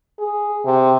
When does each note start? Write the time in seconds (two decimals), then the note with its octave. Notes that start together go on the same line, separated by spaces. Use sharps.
0.19 G#4
0.65 C3